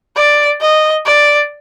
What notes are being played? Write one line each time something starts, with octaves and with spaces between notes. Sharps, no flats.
D5
D#5
D5